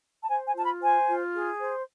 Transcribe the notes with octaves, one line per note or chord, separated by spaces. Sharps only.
A5
C5 G#5
G#5
F4 A5
B5
C5 G#5
F4
G#4
C5